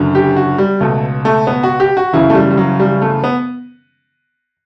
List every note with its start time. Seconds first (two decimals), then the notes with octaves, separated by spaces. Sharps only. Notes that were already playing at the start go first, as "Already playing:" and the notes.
Already playing: F#1 F#2 D3
0.15 G4
0.36 F#4
0.58 G3
0.80 C#2 B2 A3
1.25 A3
1.47 B3
1.63 F#4
1.80 G4
1.97 F#4
2.13 F#1 F#2 C#3 E3 E4
2.30 A3
2.35 G3
2.50 G3
2.57 F#3
2.80 G3
3.02 A3
3.24 B3